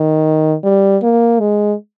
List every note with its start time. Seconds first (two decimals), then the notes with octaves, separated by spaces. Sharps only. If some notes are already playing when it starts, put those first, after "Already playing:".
Already playing: D#3
0.63 G3
1.03 A#3
1.40 G#3